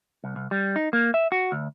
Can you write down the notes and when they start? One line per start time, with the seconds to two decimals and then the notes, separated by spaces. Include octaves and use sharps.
0.24 C2
0.36 C2
0.51 G3
0.76 D#4
0.93 A#3
1.14 E5
1.32 F#4
1.52 D2